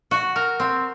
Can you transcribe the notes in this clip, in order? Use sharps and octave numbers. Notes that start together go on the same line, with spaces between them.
F#4
A#4
C4